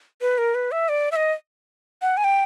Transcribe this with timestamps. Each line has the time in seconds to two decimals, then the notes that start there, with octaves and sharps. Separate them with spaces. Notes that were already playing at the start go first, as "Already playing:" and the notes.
0.21 B4
0.38 A#4
0.55 B4
0.72 E5
0.89 D5
1.12 E5
1.16 D#5
2.02 F#5
2.17 G#5
2.24 G5